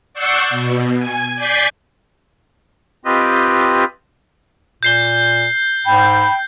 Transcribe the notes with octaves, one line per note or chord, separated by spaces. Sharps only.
D5 F#5 C#6 E6 G6 C7
B2
G#5
D5 G#5 G6 G#6 B6 C7
C4 F4 G4 B4 D#5
A#2 G6 C7 G7
G#2 G5 B5